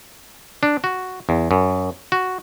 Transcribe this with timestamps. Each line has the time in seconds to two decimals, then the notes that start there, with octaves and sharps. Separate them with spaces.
0.63 D4
0.84 F#4
1.29 E2
1.51 F#2
2.12 F#4